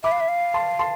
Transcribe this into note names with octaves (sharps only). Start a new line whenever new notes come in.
E5 B5 D6
F5
E5
F5
A5 C6
A5 C6